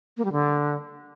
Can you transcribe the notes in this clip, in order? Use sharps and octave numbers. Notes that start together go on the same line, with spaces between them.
A#3
G3
D3